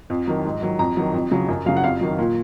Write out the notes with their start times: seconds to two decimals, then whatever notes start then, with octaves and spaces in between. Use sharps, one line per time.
0.10 F2
0.27 D#3 F#3
0.45 G#2
0.62 D#3 F#3
0.79 F2 A#5
0.97 D#3 F#3
1.14 F2
1.31 C#3 F#3
1.49 F#2
1.66 C#3 F#3 F5
1.77 F#5
1.84 F2 F5
2.01 D#3 F#3
2.19 A#2